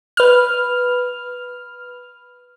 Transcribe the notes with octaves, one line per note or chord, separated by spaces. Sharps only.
B4 F6